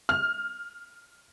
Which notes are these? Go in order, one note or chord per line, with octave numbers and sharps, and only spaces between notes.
F6